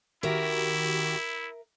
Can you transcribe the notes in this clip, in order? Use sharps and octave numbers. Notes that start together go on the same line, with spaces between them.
D#3 E4 F#4 G4 A#4 E5